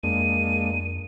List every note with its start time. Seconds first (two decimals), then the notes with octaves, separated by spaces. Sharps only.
0.03 F2 G#3 A#3 D4 D#7